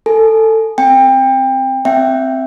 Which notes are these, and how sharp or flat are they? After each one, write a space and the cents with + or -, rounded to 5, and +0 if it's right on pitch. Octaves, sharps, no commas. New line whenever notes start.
A4 +15 G#5 +25
C4 +0 G5 +25
C4 +0 E5 +10 G5 +0